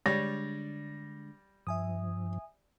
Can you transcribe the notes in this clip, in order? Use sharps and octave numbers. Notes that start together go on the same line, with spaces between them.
D3 G3 G#3 D4 C#5 D5 A#6
G2 F3 E5 G#5 D#6